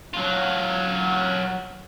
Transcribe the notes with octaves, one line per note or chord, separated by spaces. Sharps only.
F#3 F4